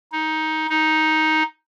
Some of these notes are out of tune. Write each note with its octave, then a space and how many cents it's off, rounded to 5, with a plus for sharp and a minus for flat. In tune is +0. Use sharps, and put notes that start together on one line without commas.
D#4 +15
D#4 +10